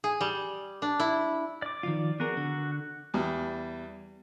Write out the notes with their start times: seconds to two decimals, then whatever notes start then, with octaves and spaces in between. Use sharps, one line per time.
0.04 G#4
0.21 G3
0.82 D4
1.00 E4
1.62 D5 D6
1.83 D#3 F3 F4
2.20 B3 F#4 G#4 A#4
2.37 D3
3.14 E2 G3